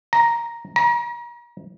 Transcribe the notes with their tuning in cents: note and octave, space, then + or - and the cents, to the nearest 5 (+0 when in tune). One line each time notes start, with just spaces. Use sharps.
A#5 +5
A#5 +40